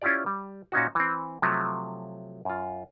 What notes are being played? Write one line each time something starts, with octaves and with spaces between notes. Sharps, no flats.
C#4 E4 F4 G4 D5
G3
A#2 C#4 D#4 F#4
E3 C4
C3 F3 F#3 A3
F#2 F4